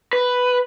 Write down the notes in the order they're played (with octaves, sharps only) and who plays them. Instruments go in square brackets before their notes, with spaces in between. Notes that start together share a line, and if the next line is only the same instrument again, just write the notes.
[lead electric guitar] B4